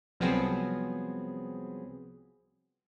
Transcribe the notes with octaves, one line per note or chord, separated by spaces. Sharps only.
C2 F3 F#3 B3 C4 G#4